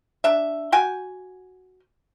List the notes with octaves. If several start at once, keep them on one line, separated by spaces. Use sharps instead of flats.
D4 E5
F#4 G5 G#5